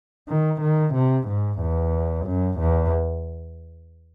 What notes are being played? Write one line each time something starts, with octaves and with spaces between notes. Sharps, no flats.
D#3
D#3
C3
G#2
E2
F#2
E2